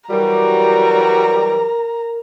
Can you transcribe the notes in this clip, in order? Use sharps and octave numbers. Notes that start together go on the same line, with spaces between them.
E3 F#3 G3 F#4 A#4 A#5